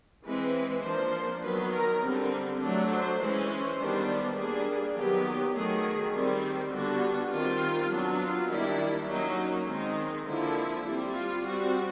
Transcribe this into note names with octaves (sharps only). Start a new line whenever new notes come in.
E3 G#3 C4 B4
F3 A#3 D4 C5
D#3 F#3 B3 B4
A#4
D3 G3 C4
F#3 A3 D4
C5
E3 G#3 C#4
C5
D#3 G3 B3 D4
G3 A#3 D4 G#4
D#3 F#3 B3 G4
D#3 F#3 A3 G#4
D#3 G3 C4
D3 G3 B3 D4 F#4
D#3 G3 C4 F4
F#3 B3 D4
F4
D#3 G3 A#3 D4 E4
F#3 A#3 C#4 D#4
D#3 G#3 C4 D#4
D3 F3 A#3 E4
G3 C4
F4
G3 C4 F#4